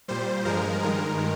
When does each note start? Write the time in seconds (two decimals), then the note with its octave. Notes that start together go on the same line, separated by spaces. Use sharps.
0.08 A#2 G3 C5
0.45 G2 F3 G#3 A#4
0.83 G2 D#3 G#3 A#4